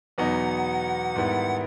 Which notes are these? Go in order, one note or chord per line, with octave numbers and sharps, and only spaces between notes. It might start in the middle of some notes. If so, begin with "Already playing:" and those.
E2 B2 F#3 B3 D#4 F#5
G#2 D#3 G3 B3 E4